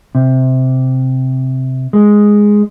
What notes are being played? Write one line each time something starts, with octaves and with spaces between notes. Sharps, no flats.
C3
G#3